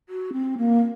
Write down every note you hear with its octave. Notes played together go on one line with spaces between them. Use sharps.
F#4
C4
A#3